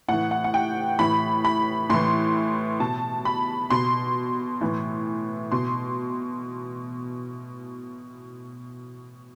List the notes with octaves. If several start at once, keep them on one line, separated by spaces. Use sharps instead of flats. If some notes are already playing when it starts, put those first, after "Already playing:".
A2 E3 F#5
F#5
F#5
G5
A2 E3 B5
B5
A2 E3 C6
B2 A5
B5
B2 C6
A2 E3
B2 C6